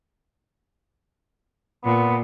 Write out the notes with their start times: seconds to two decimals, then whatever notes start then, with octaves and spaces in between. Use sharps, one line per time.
1.84 A#2 B3